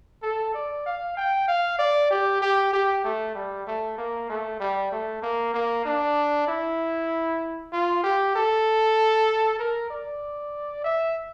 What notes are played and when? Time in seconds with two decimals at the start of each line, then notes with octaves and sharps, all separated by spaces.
0.23 A4
0.54 D5
0.86 F5
1.17 G5
1.48 F5
1.79 D5
2.11 G4
2.42 G4
2.73 G4
3.04 A3
3.35 G3
3.67 A3
3.98 A#3
4.30 A3
4.60 G3
4.92 A3
5.22 A#3
5.54 A#3
5.85 D4
6.47 E4
7.72 F4
8.04 G4
8.35 A4
9.60 A#4
9.90 D5
10.84 E5